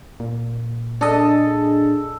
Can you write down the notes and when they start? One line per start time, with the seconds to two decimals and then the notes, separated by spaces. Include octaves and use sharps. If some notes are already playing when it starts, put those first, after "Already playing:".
0.20 A#2
1.01 D4 G#4 A4 D#5